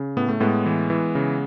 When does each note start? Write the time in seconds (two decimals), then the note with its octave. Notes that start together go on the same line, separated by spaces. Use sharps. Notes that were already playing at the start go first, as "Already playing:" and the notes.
Already playing: C#3
0.17 A2 B3
0.28 A3
0.40 A2 G#3 B3
0.66 E3
0.90 E3
1.15 C#3